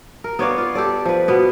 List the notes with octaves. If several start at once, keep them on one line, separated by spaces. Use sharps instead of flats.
A#4
B3 C#5 D5 F5
F4
G4 A4 D5
F3 B4
B2 B3